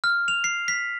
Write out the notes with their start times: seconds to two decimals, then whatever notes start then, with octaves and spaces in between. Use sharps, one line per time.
0.04 F6
0.28 F7
0.44 C7
0.68 B6